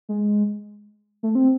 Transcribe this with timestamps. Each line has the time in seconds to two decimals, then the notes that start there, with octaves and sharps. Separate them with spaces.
0.09 G#3
1.23 A3
1.35 C4